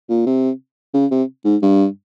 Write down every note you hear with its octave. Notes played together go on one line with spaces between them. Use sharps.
A#2
C3
C#3
C3
G#2
G2